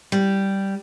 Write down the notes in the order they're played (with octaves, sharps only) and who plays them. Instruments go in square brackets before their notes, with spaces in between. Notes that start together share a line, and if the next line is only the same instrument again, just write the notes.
[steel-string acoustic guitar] G3